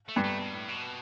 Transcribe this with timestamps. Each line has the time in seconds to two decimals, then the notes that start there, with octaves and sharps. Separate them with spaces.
0.09 A3
0.16 G2
0.24 A3
0.39 B2
0.54 A2
0.69 B2